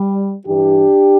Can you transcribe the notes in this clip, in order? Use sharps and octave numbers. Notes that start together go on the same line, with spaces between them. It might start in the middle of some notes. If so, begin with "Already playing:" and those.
Already playing: G3
G2 E3 D4 G4